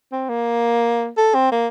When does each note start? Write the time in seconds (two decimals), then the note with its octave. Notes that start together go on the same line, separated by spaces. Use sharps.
0.12 C4
0.29 A#3
1.17 A4
1.34 C4
1.52 A#3